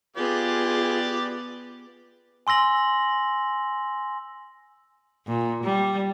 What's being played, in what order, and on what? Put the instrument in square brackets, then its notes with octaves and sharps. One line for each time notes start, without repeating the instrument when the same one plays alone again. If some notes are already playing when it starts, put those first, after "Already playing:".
[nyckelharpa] B3 [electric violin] F4 G#4 [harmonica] G4 D5
[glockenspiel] G#5 C6 E6 A#6 F#7
[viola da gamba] A#2
G3